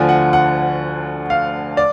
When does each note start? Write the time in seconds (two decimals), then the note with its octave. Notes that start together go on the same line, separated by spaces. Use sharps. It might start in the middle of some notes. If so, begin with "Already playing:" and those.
Already playing: D2 D3 F3 G#5
0.09 F#5
0.33 F#5
1.30 F5
1.77 D5